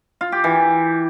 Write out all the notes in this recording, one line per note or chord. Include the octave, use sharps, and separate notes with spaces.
F4
G4
E3